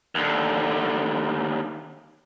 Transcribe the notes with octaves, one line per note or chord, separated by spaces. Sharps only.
D#2 D3